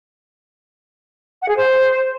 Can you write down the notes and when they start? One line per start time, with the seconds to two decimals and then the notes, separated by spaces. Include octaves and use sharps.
1.42 F#5
1.49 G#4
1.55 C5